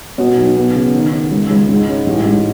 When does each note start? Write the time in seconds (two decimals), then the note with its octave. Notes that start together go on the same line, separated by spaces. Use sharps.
0.18 B2
0.37 B1
0.56 B3
0.75 C#3
0.94 D#3
1.13 D#3
1.31 C#2
1.50 C#2
1.69 G#2
1.88 C#4
2.06 A1
2.26 G#2